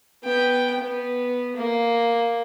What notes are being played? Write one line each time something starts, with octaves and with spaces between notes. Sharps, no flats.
B3 G5
B3
A#3